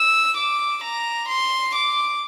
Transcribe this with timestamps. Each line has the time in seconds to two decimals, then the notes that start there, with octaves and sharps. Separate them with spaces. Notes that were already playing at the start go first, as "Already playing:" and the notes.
Already playing: E6
0.37 D6
0.84 A#5
1.29 C6
1.76 D6